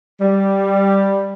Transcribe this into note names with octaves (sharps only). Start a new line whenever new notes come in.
G3